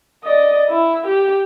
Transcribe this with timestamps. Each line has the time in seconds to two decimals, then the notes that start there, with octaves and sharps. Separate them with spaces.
0.24 D5 D#5
0.69 E4
1.06 G4